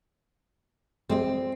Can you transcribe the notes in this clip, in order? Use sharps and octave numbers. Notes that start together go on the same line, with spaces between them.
G3 G#3 C4 G#4